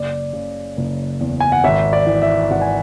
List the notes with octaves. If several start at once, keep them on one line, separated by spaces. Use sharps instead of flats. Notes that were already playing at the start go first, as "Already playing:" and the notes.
Already playing: F#1 D5
C#3
F#1
E2
G#5
F#5
G#1 E5
D5
E3
E5
G#1 F#5
G#5